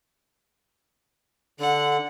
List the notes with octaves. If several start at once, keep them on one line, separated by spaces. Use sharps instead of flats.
D3 F#5